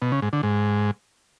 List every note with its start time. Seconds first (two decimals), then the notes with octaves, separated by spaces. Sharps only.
0.02 B2
0.12 C#3
0.22 G#2
0.33 D3
0.43 G#2